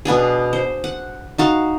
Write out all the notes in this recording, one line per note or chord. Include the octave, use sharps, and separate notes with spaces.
B2 B3 D4 G#4
C5
F#5
D#4 F#4 F5